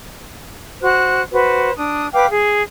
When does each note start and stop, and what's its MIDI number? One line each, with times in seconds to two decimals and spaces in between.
0.82 1.22 66
0.82 1.22 72
0.82 1.22 90
1.33 1.71 66
1.33 1.71 71
1.33 1.71 72
1.77 2.07 62
1.77 2.07 87
2.13 2.26 71
2.13 2.26 77
2.13 2.26 79
2.13 2.26 86
2.30 2.62 68